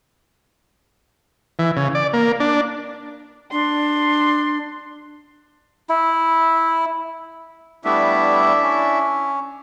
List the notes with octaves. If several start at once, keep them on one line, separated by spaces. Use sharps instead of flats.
E3
C#3
D5
A#3
D4
D4 C6
E4
G3 A3 B3 D4 E4 E5
C#4